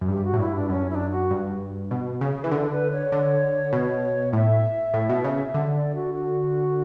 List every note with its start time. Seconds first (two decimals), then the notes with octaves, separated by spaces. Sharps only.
0.01 F#2
0.08 G2 G4
0.24 F#4
0.33 A2
0.39 G2 E4
0.55 D4
0.69 F#2 C#4
0.90 E4
0.95 D4
1.10 F#4
1.31 G2
1.91 B2
2.21 C#3
2.44 E3
2.51 D3 A4 B4
2.71 B4
2.92 C#5
3.12 D3
3.73 B2
4.33 A2 E5
4.94 A2
5.09 B2
5.24 C#3
5.54 D3
5.75 D5
5.95 F#4
6.15 F#4